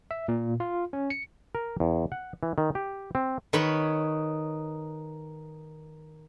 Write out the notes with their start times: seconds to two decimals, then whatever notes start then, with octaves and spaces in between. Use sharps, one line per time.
0.11 E5
0.28 A#2
0.60 F4
0.93 C#4
1.10 C#7
1.55 A#4
1.80 E2
2.12 F#5
2.43 E3
2.58 D#3
2.75 G4
3.15 C4
3.53 D#3 D#4 B4 C#5 B5